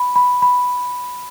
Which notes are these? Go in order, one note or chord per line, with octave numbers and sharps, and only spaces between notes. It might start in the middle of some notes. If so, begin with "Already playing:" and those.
Already playing: B5
B5
B5